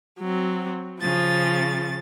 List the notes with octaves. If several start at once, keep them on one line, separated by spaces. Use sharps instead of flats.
F#3 C4
C#3 F3 A6